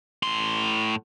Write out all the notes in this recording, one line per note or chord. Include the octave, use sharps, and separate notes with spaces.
A2 C6